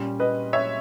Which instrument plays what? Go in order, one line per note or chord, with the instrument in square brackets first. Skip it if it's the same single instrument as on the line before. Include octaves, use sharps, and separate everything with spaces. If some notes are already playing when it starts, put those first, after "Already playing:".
Already playing: [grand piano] A#2 G3 C#4
B4 D#5
C#5 E5